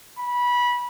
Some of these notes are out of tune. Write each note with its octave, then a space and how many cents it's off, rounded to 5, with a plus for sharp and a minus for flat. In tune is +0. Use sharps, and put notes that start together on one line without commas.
B5 -20